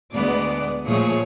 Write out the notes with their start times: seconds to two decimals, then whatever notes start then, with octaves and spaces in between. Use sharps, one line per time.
0.13 D2 G#3 B3 D5
0.84 A#2 F3 A3 G#4 C#5